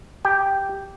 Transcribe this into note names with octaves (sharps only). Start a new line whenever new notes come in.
G4 G5